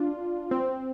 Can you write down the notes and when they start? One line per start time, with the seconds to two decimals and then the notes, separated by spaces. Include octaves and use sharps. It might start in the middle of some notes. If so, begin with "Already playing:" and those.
Already playing: D4 F4
0.51 C4